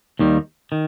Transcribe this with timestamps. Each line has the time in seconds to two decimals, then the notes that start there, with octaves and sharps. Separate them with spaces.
0.19 D#2 D#3 G3
0.72 D#3